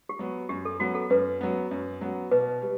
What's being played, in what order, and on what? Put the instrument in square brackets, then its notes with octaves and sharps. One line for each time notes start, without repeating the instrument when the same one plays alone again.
[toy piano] G4
[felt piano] F#3 B3
[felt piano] F#2 [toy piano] G4
[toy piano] A4
[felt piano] F#3 B3 [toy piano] F#4
[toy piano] A4
[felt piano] F#2 [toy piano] B4
[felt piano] F#3 B3
F#2
F#3 B3
[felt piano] B2 [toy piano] B4
[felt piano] G3